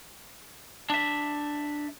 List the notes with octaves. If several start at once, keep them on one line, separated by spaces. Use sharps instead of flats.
D4 E5